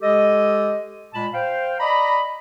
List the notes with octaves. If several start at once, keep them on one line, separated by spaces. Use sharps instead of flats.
G#3 G4 A4 D#5
A#2 G#3 A5 B5
C5 F5 G5
D5 D#5 A#5 B5